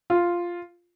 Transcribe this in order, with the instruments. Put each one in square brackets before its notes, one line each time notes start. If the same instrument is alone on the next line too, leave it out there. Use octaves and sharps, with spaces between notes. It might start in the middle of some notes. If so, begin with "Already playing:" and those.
[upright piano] F4